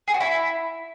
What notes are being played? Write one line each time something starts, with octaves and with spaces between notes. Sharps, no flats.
G#4
F#4
E4